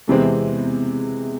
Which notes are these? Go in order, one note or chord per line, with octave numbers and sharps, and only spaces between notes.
E2 C3 E3 G#3 C4